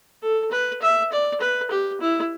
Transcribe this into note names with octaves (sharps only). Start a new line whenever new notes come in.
A4
B4
E5
D5
B4
G4
E4